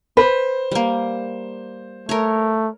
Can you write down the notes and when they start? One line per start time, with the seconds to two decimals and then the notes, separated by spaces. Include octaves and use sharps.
0.17 B4 C5
0.72 G3 A#3
2.09 A3 A#4 C#5